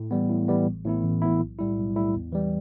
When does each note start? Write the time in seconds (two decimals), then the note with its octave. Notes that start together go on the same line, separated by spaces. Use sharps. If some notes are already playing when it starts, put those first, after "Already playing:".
Already playing: A2
0.11 E3 G3 B3
0.29 A2
0.48 E3 G3 B3
0.66 A1
0.85 A2 E3 B3 E4
1.03 A1
1.22 A2 E3 B3 E4
1.40 B1
1.59 A2 G3 E4
1.77 B1
1.95 A2 G3 E4
2.14 E2
2.32 E3 G3